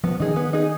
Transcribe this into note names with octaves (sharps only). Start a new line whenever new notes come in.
F3 B3
D#3 D#4 G#4
B3
D#4 G#4